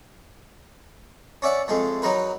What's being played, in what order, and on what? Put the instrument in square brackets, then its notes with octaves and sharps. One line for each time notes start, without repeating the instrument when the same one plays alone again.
[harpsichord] C#4 D5 E5 F#5
F2 G#3 A3
F#3 D#4 A#4 B4